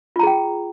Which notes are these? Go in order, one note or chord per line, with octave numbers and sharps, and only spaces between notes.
F4 G#4 G5 A#5